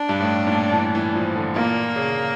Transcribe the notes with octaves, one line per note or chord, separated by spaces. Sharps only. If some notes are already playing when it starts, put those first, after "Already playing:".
Already playing: D4
G2
A2
A#2
E3
E3
F3
D3
A#2 A#3
C#3